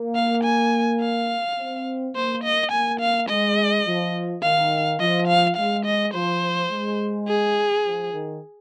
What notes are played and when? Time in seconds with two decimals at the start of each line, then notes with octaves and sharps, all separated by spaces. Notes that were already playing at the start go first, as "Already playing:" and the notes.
Already playing: A#3
0.15 F5
0.43 G#5
1.01 F5
1.58 C4
2.15 A#3 C5
2.44 D#5
2.72 A#3 G#5
3.00 F5
3.29 G#3 D#5
3.86 F3
4.42 D#3 F5
5.00 F3 D#5
5.28 F5
5.57 G#3 F5
5.86 D#5
6.14 F3 C5
6.71 G#3
7.28 G#4
7.85 F3
8.13 D#3